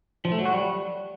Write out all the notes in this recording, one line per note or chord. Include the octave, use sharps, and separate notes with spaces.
F3
A3
F#3
F#4
G3